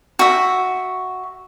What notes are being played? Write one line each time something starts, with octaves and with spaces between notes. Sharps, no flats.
F#4 E5